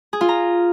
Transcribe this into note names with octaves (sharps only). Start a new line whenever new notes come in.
G#4
F4
A#5